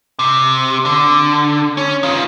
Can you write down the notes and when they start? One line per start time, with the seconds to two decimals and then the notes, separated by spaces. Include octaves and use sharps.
0.19 C3
0.85 D3
1.77 C#4
2.03 D#3 F4